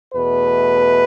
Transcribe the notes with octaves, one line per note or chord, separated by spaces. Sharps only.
E2 B2 A3 B4